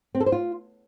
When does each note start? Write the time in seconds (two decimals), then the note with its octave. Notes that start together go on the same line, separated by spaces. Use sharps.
0.15 C4
0.20 A4
0.26 C5
0.32 F4